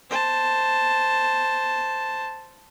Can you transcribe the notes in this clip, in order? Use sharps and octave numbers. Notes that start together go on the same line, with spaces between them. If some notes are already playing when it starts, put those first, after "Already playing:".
C5 A5